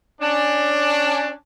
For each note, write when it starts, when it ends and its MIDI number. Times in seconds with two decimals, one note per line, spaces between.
0.21 1.30 61
0.21 1.30 62